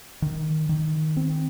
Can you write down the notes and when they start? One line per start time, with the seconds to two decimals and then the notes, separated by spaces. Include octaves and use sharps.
0.22 D#3
0.69 D#3
1.17 C4